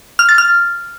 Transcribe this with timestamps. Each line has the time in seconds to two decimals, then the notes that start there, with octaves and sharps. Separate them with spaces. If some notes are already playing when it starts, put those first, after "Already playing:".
0.19 F6
0.29 A6
0.38 F6